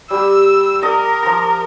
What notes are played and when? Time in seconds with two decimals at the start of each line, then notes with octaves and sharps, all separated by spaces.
0.10 G3 G4 E6
0.82 A#4 D5 D#5 D6
1.23 F3 A#5